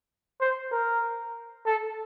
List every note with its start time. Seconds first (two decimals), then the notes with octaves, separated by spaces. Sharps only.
0.41 C5
0.71 A#4
1.66 A4